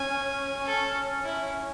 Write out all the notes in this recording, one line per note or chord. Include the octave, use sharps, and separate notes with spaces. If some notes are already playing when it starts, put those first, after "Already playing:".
Already playing: C#4 G#5
A4
E4